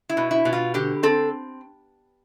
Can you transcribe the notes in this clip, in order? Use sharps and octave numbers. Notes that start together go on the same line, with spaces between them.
E4
B2
E4
B2
F4
D3 G4
C4 A4